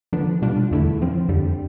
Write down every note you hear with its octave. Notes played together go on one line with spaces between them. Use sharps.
D3 F3 B3 D4
B2 G3 D4 F4
E2 D3 A3 E4
A2 F3 C4
F2 D3 G3